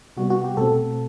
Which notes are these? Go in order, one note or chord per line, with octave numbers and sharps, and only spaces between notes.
C3 G3 B3 F#4
F#4
G4
B2 A3 C4 A4